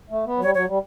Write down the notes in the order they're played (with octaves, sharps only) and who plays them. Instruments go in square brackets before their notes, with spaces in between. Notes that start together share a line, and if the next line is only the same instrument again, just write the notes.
[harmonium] A3
B3
F#3
[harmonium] G3 [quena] C#5
[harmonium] F#3 [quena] C#5
[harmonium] G3